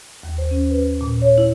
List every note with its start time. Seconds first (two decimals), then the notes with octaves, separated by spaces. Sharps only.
0.23 D#2
0.38 C5
0.51 C#4
0.70 B4
1.01 A#2
1.22 C#5
1.38 E4